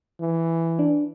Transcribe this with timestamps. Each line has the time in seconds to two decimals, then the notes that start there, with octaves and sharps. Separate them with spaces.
0.20 E3
0.79 D4